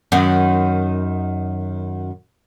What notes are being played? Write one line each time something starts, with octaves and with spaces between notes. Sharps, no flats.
F#2 D#3